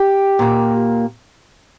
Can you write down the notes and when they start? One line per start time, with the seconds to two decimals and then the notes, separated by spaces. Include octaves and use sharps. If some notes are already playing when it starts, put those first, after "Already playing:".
Already playing: G4
0.39 A#2 A#3